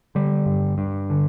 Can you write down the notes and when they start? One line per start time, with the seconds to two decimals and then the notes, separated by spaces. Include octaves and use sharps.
0.15 D3 G3
0.46 G2
0.78 G2
1.10 D3